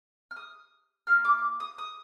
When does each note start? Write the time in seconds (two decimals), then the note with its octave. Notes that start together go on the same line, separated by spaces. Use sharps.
0.31 F6
0.36 D#6
1.07 A#3 F4 F6
1.25 D6
1.60 D#6
1.78 D#6